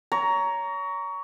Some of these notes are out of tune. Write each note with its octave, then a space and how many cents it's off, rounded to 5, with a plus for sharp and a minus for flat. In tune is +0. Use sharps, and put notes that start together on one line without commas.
C#5 +25 A#5 +0